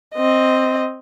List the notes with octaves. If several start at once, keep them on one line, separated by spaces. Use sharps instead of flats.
C4 D#5